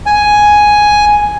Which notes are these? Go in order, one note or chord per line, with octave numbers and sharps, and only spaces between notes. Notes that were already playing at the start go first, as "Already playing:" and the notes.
G#5